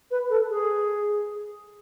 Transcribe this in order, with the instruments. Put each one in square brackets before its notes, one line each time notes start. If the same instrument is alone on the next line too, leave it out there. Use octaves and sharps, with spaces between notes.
[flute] B4
A4
G#4